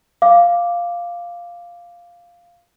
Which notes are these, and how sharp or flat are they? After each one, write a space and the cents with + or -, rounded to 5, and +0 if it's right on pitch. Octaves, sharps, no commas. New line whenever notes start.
F5 +0 D6 +0